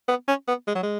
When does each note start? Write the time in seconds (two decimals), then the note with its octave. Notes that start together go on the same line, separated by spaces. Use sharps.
0.08 B3
0.28 C#4
0.48 B3
0.67 G#3
0.75 F#3
0.83 G#3